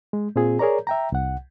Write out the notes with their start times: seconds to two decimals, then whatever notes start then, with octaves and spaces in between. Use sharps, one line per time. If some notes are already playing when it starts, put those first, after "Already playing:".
0.13 G#3
0.36 A#2 C4 F4 G#4
0.59 G#4 A#4 C#5 D5 A#5
0.87 E5 G5 A#5
1.12 C2 F#5